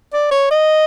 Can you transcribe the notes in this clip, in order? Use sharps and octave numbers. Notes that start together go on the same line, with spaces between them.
D5
C#5
D#5